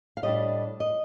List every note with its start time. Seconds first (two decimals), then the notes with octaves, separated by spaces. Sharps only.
0.17 F5
0.23 A2 G3 D4 D#5
0.80 D#5